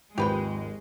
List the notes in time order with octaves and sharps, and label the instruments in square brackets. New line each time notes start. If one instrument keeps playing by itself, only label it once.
[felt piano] G#1 D#2 F3 [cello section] G#3 [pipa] G4 B4 G5